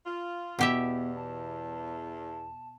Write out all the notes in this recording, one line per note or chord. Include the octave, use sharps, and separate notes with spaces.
F4
E2 B2 B3 G4 E5
A5